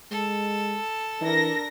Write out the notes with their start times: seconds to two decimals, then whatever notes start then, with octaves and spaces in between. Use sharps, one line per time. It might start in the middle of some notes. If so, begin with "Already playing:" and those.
0.11 G#3 A4
1.21 E3 D4 A#4 A#6